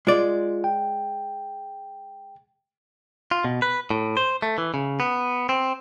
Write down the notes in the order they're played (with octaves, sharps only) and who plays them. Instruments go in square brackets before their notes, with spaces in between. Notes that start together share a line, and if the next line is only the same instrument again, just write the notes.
[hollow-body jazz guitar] G#3 D5 [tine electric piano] F4
[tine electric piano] G5
[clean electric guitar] F4
B2
B4
A2
C5
A3
E3
C#3
B3
C4